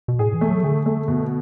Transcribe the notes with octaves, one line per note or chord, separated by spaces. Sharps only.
B2
A2 G#4
E3
A3
F#3
D3 G#4
A3
B2